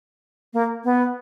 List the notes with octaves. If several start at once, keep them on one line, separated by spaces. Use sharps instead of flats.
A#3
B3